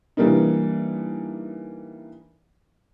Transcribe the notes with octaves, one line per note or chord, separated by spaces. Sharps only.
E3 G3 A#3 D4 D#4